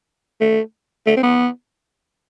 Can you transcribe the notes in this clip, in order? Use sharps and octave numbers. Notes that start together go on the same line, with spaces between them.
A3
A3
C4
B3